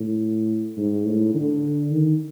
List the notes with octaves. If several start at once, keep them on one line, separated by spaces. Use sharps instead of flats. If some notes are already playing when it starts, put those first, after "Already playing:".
Already playing: A2
G#2
A2
D3
D#3